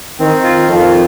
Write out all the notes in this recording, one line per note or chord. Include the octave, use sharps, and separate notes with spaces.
D#3 C4
F4
F2 D#3